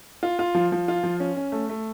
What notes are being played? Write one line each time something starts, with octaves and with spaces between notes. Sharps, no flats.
F4
F4
F3
F3
F4
F3
C#4
C#4
A3
A3